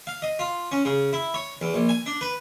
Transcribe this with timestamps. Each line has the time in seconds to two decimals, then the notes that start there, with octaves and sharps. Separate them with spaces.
0.07 F5
0.22 D#5
0.39 F4
0.72 C#4
0.85 C#3
1.13 E4
1.34 C#5
1.61 E2
1.74 A#1
1.89 G#5
2.06 D4
2.21 B4